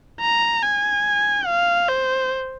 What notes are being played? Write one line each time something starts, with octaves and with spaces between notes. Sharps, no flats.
A#5
G#5
F5
C5